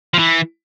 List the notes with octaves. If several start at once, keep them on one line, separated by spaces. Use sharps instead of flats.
F3
E3